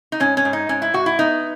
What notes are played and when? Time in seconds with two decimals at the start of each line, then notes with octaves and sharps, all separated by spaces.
0.12 D#4
0.20 G#2 C#4
0.37 C#4
0.45 G#2
0.53 D#4
0.69 G#2 C#4
0.82 E4
0.94 G#2 F#4
1.06 E4
1.19 B3 D#4